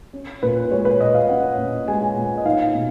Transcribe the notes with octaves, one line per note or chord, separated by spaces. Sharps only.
C#4
A#2 B4
G#3 C#5
B4
A#2 D#5
F5
C#4 F#5
A#2
G#3 G#5
A#2
D#5
D#4 F5
B2